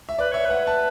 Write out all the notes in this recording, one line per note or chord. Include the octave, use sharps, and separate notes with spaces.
E5
B4 D5
C#5 E5
B4 F#5
A5